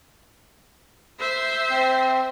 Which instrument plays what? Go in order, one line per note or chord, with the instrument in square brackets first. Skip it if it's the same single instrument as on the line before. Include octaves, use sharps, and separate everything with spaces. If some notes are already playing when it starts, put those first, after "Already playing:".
[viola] C5 E5
[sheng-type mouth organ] C4